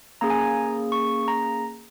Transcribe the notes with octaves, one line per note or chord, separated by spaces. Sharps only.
A#3 C#4 G#4 A#5
G#5
A#5
C#6
A#5